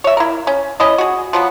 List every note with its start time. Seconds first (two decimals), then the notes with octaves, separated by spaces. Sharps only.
0.04 C#5 E5
0.17 E4 A#4
0.47 C#4
0.80 C#4 E4 D#5
0.98 F#4 G#4
1.33 F3 F#3 B3